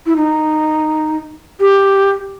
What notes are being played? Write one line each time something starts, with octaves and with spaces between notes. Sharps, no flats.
E4
D#4
G4